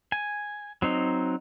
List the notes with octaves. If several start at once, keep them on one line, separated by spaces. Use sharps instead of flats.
G#5
F#3 C4 D#4